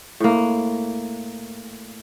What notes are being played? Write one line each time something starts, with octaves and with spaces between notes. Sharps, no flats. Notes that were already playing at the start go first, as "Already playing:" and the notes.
A2 A#3